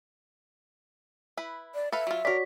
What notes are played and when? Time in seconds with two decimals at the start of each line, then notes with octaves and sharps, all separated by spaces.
1.37 E4 B4
1.75 D5
1.92 A4 B4 E5 F5
2.07 F#3 F4
2.25 D4 F#4 A#4 C#5 D5 B6